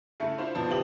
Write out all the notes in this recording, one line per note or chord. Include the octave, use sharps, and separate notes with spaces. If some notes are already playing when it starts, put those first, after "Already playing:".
C#3 A3 E4 C#7
D4 E4 F4 C5
G#1 B2 F3 B3 C5 A5
C#3 E3 F4 G4 D#6 F#7